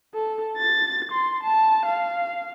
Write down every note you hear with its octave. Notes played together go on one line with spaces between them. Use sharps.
A4
A6
C6
A5
F5